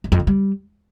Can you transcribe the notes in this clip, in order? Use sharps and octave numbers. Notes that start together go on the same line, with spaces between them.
F#2
F2
D3
G3